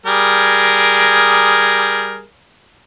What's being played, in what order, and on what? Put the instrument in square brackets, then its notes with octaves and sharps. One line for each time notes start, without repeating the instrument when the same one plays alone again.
[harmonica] G3 G#4 A#4